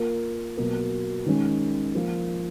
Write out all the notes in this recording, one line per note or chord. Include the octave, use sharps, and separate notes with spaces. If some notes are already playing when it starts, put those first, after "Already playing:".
Already playing: A#3 F4 A#4
B2 F#3 A#3
D#3 G#3 C#4
F3 A#3 F4